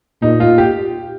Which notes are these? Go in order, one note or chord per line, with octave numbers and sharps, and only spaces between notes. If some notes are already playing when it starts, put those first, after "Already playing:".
A#2 D#4
F4
G4